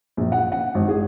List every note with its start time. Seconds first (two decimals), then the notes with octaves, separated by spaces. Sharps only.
0.17 A#1
0.32 F#5
0.52 F#5
0.75 G#1
0.89 G#4